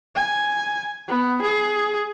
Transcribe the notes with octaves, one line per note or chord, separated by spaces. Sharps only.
G#5
B3
G#4